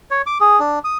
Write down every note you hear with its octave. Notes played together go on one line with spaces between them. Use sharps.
C#5
D6
G#4
D4
D#6